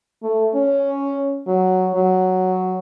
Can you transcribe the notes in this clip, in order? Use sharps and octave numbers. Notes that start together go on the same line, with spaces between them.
A3
C#4
F#3
F#3